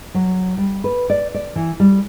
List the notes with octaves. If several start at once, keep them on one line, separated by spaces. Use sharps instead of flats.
F#3
G3
B4
D5
D5
E3
G3